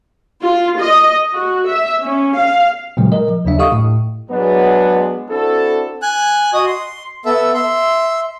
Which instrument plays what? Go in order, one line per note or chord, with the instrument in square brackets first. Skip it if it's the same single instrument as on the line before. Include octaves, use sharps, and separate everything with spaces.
[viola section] F4
D#5
F#4
E5
C#4
F5
[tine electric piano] A#2 C#3 F#3 G#3
A#4 D#5
F3
D#2 C#3 F#3 D4 E5
G4 A4 D#5 F5 C#6 D#6
A2
[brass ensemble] F#3 G#3 B3 D4
C4 D4 E4 F#4 A4
[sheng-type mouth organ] G#5 F#6
F#4 D#5 D#6
C6
B3 A4 E5
E5 C6